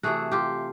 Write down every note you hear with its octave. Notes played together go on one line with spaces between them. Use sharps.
C3 E3 A3 F#4 G#4
F4 G4